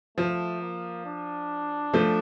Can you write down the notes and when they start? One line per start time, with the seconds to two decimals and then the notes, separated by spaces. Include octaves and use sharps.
0.18 F3 A3
0.62 A#3
1.06 D4
1.93 F3 A3